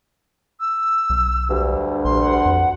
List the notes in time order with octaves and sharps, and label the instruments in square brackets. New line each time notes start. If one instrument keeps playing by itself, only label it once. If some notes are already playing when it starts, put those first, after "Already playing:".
[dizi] E6
[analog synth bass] B1
[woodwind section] D2 G2
[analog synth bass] A#1 [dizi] C6
[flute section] F#5
[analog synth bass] F2